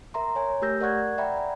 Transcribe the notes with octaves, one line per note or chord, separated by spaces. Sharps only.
A#4 E5 A#5 C6
C#5 G#5
A3 G4 A#4 E6 G6 A#6
A#4 D5 F#5 C#6 F#6 G#6
D5 E5 F#5 G5 A#5 B5
G#5